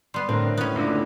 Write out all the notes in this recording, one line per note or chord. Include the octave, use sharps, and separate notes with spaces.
G3 B3 C6
A2 D3 C4 A#4
B3 C#4
C#2 D3